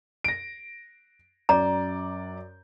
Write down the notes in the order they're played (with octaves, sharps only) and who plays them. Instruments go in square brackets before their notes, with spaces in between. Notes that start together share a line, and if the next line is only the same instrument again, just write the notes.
[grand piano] A#6 D7
[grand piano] F#2 D5 G6 [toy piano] A#5